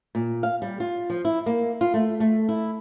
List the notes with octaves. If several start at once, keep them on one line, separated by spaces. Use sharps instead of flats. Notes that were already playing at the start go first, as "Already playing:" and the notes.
A#2
F5
G3
F4
F3
E4
A#3
F4
A3
A3
E4